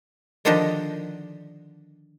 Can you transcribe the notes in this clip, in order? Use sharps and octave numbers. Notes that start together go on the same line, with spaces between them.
D3 D#3 F3 D4 G4 D#5